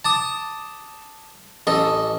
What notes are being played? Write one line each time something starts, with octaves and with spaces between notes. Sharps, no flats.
A5 D6 D#6
A1 A4 D#5